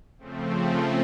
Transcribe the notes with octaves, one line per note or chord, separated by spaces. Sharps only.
C#3 F3 A3 C4